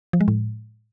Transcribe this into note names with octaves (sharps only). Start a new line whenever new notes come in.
F3
G#3
A2